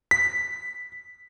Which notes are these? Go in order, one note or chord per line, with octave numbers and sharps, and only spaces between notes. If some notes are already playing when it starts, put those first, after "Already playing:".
B6